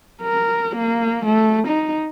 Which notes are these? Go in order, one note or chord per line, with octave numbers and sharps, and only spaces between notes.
A#4
A#3
A3
D#4